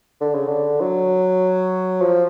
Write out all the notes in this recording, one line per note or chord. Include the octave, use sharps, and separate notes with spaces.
D3
C#3
D3
F#3
F3